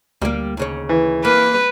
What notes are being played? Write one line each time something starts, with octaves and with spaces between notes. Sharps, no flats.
D2 G3 A#3
D#2 C#3 C#5
E3
A#3 B4